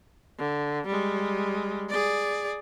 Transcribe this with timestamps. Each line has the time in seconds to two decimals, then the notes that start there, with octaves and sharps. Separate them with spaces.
0.39 D3
0.87 G3 G#3
1.89 G#4 D5